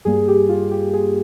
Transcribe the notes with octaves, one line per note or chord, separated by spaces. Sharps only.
G2 G3 A#3 G#4
G4
F4
G4
G#4